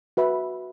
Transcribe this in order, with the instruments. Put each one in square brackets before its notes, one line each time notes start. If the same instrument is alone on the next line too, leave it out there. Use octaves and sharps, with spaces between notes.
[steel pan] F#4 B4 E5 B5